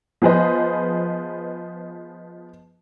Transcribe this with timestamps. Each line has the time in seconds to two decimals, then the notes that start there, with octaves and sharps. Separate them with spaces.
0.22 F3 B3 G#4 B4 C5 D#5